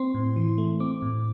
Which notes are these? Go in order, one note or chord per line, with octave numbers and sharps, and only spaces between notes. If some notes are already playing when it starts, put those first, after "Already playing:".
Already playing: C4 C6
A2
E3
A3
C4 D6
A2